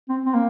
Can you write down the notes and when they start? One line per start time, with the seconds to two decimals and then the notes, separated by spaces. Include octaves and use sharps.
0.09 C4
0.25 C4
0.34 A#3